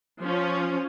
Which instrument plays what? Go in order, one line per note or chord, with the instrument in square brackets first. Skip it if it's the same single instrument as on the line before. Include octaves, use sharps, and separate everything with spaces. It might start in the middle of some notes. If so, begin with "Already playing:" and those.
[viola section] F3 C#4